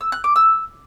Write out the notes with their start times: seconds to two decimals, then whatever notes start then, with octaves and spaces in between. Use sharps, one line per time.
0.01 E6
0.12 F#6
0.24 D6
0.36 E6